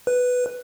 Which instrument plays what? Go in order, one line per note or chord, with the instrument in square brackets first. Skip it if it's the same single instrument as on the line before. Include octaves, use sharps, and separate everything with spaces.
[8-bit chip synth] B4